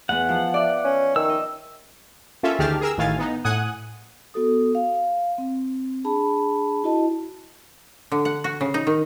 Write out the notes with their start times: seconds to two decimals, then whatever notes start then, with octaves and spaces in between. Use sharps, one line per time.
0.09 E2 B3 F#5
0.29 F3
0.54 D5 E5
0.85 C#4
1.16 D#3 E6
1.29 D#5
2.43 A#3 C#4 F4 A4 E5
2.59 D2 D#3 G4 G#4 A5 F6
2.81 G#4 A#4 E6
2.98 A1 A2 D#3 F5 G#5 A6
3.19 B3 D#4
3.44 A2 F#5 G#5 D#6 F#6
4.34 B3 F#4 A4 D#6
4.75 F5
5.38 C4
6.04 D4 G#4 A5 B5
6.84 E4 F#4 D#5 A5
8.12 D3
8.25 F#5
8.44 F#4
8.61 C#3
8.74 D#4
8.87 D#3